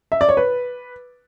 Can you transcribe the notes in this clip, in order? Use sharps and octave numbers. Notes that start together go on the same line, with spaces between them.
E5
D5
C#5
B4